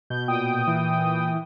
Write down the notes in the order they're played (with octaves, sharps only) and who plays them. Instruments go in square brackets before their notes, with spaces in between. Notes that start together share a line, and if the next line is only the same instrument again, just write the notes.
[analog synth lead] B2 [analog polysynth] G6
[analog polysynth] A#2 G5 D#6
[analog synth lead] E3